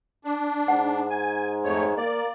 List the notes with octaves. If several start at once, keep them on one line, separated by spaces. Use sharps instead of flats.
D4
G#2 F#5
G#5
F2 A3 C#5
A#3 D5